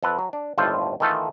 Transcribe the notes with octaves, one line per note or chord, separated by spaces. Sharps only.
F2 A4 B4
F#3
D4
G1 D#2 A2 F4 A4 C5
D#3 E3 A3 F4 A4